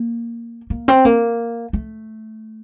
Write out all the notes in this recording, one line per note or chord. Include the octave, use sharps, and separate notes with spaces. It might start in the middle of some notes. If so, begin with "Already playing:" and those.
Already playing: A#3
A#3
C4
A#3
A3